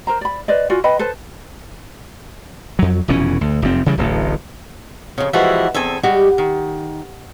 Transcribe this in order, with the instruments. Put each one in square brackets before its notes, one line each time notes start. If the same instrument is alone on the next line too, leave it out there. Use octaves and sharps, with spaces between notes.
[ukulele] A#4 C5 A#5
D5 B5
B4 C5 D5 D#5
F4 F#4 D5 G#5
B4 D#5 G5 B5
A4 B4 C5 A5
[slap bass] F2 F#3
F1 B2 E3 C#4
D2
F1 F#2 C4
C#3 E3 G3
D1 A1 A2
[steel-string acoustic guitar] F2 C#3
E3 F3 G3 G#3 E4 F#4
E2 C4 A4 G#5
G3 G#3 F#4 G4
D#3